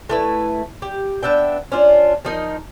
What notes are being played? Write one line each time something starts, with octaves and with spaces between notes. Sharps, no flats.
A3 E4 B4
G4
B3 D4 E5 G5
C#4 D4 F4
F3 D#4 A#4